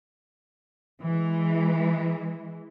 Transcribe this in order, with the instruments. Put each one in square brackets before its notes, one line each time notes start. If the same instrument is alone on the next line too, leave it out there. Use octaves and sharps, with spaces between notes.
[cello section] E3 G#3